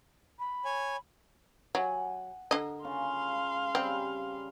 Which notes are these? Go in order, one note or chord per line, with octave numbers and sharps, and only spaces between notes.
B5
C#5 G#5
F#3 F#5 G#5
D3 A#4 D#5
C#3 F4 F5 C6 C#6
C#3 G3 C4